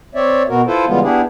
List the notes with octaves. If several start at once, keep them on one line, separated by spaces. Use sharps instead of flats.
C4 C#5 D5 E5
B2 B3 F#4 A#4
E4 F4 A4 B4 C5
C#3 E3 G3 G#3 B3 F4
B3 D4 E4 G4 G#4